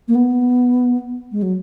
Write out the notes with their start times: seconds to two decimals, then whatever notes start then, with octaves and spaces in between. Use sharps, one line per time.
0.08 A#3
0.15 B3
1.32 G#3
1.42 F#3